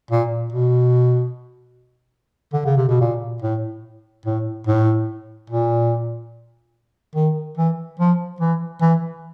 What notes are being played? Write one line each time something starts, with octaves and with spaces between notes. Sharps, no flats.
A#2
B2
D3
C#3
C3
B2
A#2
A2
A2
A2
A#2
D#3
E3
F3
E3
E3